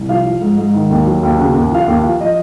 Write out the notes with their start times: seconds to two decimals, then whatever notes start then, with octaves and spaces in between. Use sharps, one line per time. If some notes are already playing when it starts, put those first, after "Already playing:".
Already playing: C2
0.09 F3 F5
0.26 F3
0.41 G#2
0.58 G#2
0.74 D#3
0.91 D#2
1.06 F#3
1.23 D#2
1.39 C#3 F#5
1.55 D#2
1.71 F3 F5
1.82 F#5
1.88 D#2
2.03 F3 F5
2.21 F3 D#5